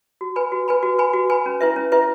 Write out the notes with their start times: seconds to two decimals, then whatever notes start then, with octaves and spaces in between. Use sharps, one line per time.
0.21 F#4
0.36 B4 G#5 B5
0.52 F#4
0.68 B4 G#5 B5
0.83 F#4
0.98 B4 G#5 B5
1.13 F#4
1.30 B4 G#5 B5
1.46 C#4
1.61 E4 B4 E5
1.76 C#4
1.92 E4 B4 E5